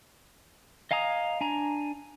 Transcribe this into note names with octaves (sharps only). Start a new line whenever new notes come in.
D#5 F5 G#5 A#5 D#6
D4 G#5 A#5